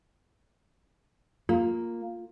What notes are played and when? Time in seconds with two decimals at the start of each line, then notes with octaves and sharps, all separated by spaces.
1.49 A#3 F4